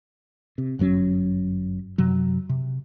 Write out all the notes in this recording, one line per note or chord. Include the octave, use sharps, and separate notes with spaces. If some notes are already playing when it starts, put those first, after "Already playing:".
C3
G1 F#2 F#3 C#4
F#2 C3 F#3
C3